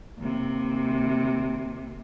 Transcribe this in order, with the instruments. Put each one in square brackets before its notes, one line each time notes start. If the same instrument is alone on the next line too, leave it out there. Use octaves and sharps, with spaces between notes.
[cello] D#2 C3